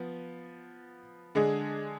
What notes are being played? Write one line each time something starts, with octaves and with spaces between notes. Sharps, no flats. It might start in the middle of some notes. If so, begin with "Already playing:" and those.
Already playing: F3 B3
D3 G#3 D4 G#4